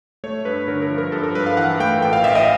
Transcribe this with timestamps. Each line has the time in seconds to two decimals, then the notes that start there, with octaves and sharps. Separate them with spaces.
0.24 A3 C#5
0.45 G2 B4
0.68 D3 A#4
0.82 A#4
0.90 F3
0.98 A#4
1.12 G2 A4
1.23 A#4
1.35 G2 B4
1.46 F5
1.57 E3 F#5
1.79 A3 G5
2.02 A1 G5
2.13 F5
2.24 A1 E5
2.35 D#5